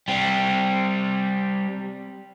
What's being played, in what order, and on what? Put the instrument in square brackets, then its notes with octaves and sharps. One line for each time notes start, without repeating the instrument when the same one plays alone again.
[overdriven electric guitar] G3 C4